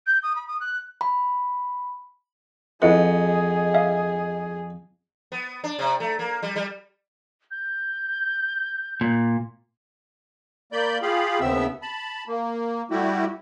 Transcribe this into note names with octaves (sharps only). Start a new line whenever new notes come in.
G6
D#6
B5
D#6
F#6
B5
F2 E4 G#4 B4 D#5 F#5 C#7
E5 F5
B3
D4
C3
A3
A#3
G3
G3
G6
A#2
A#3 D5 B5 G6
F4 G4 G#4 F5 B5
D#2 C#3 B3 C4 E5 E6
A5 B5
A#3
G3 A3 E4 F#4 G4